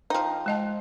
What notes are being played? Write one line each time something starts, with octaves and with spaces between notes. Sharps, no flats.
F3 D#4 C5 G5
G#3 D#5 A5